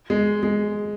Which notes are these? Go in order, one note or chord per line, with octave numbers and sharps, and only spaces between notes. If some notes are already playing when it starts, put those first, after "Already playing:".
G#3
G#3